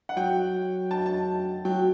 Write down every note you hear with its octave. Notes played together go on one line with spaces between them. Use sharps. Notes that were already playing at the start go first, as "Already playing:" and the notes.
F#5
F#3 G5
A5
A5
F#3 G5